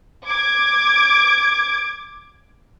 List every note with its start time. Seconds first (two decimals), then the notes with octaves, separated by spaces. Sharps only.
0.26 D6 G#6